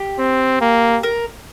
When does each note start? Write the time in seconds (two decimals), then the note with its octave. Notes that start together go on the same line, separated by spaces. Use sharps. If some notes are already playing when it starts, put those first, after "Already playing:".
Already playing: G4
0.19 C4
0.62 A#3
1.03 A#4